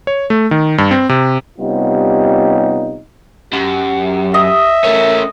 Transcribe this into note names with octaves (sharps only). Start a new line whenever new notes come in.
C#5
A3
D#3
G2
C4
C3
C3 G3 B3 C#4 D#4 F4
F#2 G4
D#5 E5
A3 C#4 A#4